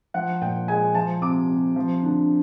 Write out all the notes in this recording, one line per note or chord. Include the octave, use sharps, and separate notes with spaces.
F3 F#5
A#2 G5
G#3 G#5
F3 A5
C3 D6
C3
F3
D3